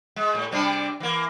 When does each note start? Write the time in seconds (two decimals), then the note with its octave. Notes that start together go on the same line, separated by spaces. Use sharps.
0.16 G#3
0.35 A2
0.51 C3 G3 D4
1.00 E3 A#3